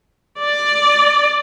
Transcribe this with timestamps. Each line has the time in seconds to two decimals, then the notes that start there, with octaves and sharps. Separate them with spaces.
0.40 D5